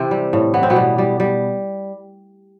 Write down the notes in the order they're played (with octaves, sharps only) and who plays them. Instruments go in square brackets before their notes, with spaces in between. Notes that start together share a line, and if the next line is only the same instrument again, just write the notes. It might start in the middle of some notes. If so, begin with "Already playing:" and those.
Already playing: [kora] C3 E3 C4
G3
A2
E3 B3
C4
B2 B3
G3
G3
G3